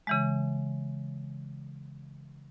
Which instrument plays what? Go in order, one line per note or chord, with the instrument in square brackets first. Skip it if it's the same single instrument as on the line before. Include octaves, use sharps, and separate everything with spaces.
[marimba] C#3 E3 G#3